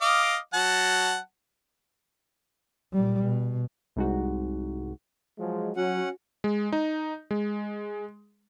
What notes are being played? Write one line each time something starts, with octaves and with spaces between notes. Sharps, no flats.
D#5 F5 D6
F#3 F#5 A5
A#2 G3
B2
C2 G#2 F#4
F3 F#3 G#3
F#3 C#4 F#4 F#5
G#3
D#4
G#3